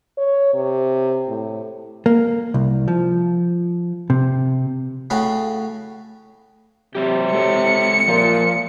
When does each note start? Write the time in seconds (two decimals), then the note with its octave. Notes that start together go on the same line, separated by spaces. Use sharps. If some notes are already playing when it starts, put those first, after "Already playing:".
0.18 C#5
0.54 C3
1.28 A2
2.06 A#3
2.54 C2
2.88 F3
4.10 C3
5.10 A2 C#3 C#4 F#4 C#5 B5
6.95 C3 F#3 G4
7.33 G#3 A4 C#5 C#7
8.08 A#2 F3